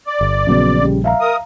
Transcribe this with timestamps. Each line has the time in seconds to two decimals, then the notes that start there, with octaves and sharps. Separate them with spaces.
0.07 D5
0.21 G1
0.47 A#1 C#3 F#3 B3
0.81 C#3 G3
1.04 E5 F5 A#5
1.21 A#4 D#6